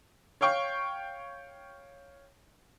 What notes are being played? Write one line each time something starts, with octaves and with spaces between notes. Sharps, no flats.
C#5 F5 G5 C#6